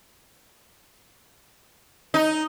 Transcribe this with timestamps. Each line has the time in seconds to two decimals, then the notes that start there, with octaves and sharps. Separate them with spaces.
2.14 D#4